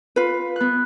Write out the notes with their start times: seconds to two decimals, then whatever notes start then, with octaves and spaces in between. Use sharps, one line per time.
0.16 F4 B4
0.56 B3 F#6